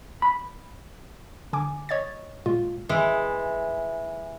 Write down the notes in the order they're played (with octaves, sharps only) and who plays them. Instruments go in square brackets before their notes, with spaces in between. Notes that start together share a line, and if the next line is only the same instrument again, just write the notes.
[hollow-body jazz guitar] B5
[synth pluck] D3 G#5 D6
C#5 D#5 G#6 A6
A#2 G#3 F4
[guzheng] E3 G#3